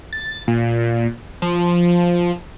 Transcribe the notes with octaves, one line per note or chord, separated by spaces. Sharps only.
A6
A#2
F3